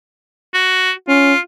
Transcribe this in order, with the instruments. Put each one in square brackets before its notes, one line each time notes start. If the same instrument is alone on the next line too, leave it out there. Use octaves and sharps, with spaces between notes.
[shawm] F#4
[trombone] C#4 [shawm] F4